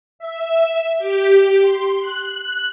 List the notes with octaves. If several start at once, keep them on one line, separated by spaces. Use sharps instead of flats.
E5
G4
C6
F#6